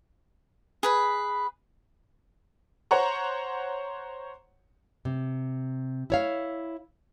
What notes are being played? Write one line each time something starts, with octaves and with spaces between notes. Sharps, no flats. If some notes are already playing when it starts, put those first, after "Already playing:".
G#4 B4 B5
C5 C#5 F#5 A#5 C#6
C3
E4 C#5 F5